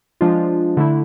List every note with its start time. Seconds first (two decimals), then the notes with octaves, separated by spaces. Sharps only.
0.21 F3 G#3 D4 F4
0.77 D3 A3 E4